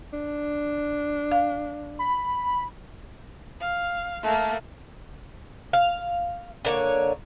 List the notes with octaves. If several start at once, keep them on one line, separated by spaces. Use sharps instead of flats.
D4
F5
B5
F5
A3 A#3
F5
D3 A#3 C#5